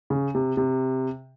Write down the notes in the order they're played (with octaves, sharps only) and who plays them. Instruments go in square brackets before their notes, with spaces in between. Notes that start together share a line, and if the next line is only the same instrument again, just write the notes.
[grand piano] C#3
C3
C3